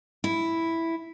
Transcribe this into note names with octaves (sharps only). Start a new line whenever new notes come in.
E4